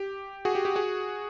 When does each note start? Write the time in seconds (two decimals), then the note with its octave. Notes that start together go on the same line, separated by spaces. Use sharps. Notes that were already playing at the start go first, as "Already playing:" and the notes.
Already playing: G4
0.45 F#4 G#4
0.55 G4
0.65 G4
0.75 F#4 G#4